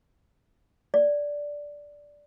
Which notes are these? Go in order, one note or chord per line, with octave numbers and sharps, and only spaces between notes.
D5